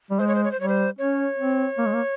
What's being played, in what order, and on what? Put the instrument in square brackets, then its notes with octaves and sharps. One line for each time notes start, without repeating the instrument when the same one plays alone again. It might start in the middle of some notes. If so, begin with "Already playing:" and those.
[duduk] G3
[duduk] G#3 [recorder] C5
[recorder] C#5
C5
C#5
C5
[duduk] G3 [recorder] C#5
[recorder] C5
[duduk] C#4 [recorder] C#5
[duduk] C4
A#3
G#3
A#3